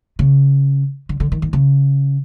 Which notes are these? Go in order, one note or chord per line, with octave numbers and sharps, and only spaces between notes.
C#3
D3
D3
D#3
D#3
C#3